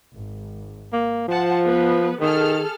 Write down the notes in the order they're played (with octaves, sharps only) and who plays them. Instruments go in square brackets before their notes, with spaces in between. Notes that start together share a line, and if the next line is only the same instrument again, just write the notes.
[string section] G#1
[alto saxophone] A#3
[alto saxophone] F3 [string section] C5 F#5 A5
[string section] B3 B4
[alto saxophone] D#3 [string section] G#4 A4 F6